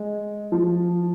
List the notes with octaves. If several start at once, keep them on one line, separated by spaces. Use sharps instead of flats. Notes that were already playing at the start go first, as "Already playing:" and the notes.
Already playing: G#3
F3